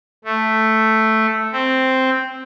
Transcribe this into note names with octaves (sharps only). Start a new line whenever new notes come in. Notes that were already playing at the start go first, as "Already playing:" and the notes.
A3
C4